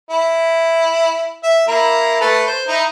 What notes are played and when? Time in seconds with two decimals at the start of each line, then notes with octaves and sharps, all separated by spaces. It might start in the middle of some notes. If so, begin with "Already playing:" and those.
0.11 E4
1.43 E5
1.68 A#3 E4 A#5
2.21 A3 A4 B4
2.47 C5
2.68 D#4 E4